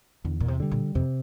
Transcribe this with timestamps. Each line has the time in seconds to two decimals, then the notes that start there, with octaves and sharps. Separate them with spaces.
0.24 E2 D3
0.40 A#2
0.48 C3
0.60 D3 G3
0.71 A#2
0.95 F2 C3